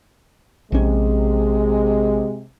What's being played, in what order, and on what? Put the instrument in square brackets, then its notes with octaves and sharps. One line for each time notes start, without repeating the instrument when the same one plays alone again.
[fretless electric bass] A#1 C#4 [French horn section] C3 G#3